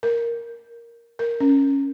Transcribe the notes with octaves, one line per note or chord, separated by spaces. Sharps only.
A#4
A#4
C#4